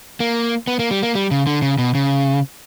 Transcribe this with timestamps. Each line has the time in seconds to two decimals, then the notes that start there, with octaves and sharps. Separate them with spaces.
0.20 A#3
0.68 B3
0.79 A#3
0.91 G3
1.03 A#3
1.15 G3
1.31 C#3
1.47 D3
1.62 C#3
1.78 B2
1.95 C#3